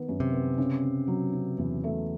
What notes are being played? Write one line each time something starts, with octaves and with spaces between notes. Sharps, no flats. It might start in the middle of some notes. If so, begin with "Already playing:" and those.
Already playing: D#3 B3
F#2
C3
B3
C#3
C#3
F#3
C#3
E2
A3